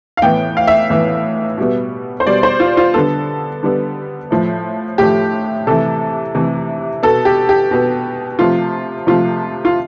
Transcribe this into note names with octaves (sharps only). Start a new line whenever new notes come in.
F5
A2 E3 B3 G5
F5
E5
A2 E3 B3
B2 G3 B3
C5
B2 G3 B3 D5
C5
F4
F4
D3 G3 B3 A4
D3 G3 B3
A2 F3 A3
A2 F3 A3 G4
C3 E3 A3 A4
C3 E3 A3
B2 B3 A4
G4
G4
B2 B3
C3 F3 A3 F4
C3 F3 A3 F4
F4